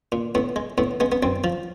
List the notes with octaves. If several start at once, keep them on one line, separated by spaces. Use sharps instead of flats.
A#2
A2 B3
G#3
A2 B3
G#3 B3
B3
F#2 C4
F3